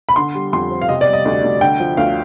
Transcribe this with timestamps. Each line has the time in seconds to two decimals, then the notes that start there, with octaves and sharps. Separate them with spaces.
0.09 B5
0.16 D3 C6
0.35 G3
0.53 F2 C6
0.71 C4
0.82 F5
0.89 C3 D#5
1.01 D5
1.07 G3
1.13 D#5
1.25 D2
1.44 D2
1.61 D3 G5
1.80 F3
1.97 D2 F5